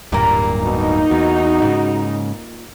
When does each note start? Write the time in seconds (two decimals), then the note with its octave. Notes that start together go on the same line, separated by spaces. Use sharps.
0.12 D1 G2 A#2 G3 A#3
0.63 B2 D#4
1.11 E2 F#4
1.62 G#2 C#3